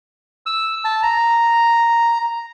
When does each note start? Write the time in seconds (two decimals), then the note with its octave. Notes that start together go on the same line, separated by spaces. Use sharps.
0.46 E6
0.85 A5
1.03 A#5